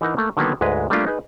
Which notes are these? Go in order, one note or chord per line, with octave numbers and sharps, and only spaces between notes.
E3 D#4 A#4 F#5 G#5 A#5
A3 A#3
D3 D#3 F#3 A#3 B3
D2 G#2 G#3 B4
G3 A3 A#3 D4 F4 G4
D#4 G#4 B4